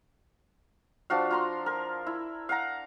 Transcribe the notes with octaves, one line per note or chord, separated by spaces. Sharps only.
F3 D4 F#4 F5
F4 A#5 C6
A#4
E4
F5 F#5 A#5